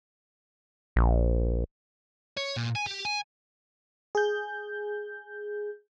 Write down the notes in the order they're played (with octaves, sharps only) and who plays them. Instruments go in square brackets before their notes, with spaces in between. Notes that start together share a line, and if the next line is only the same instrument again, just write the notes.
[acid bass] A#1
[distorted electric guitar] C#5
A#2
G#5
G4
G#5
[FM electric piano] G#4 G6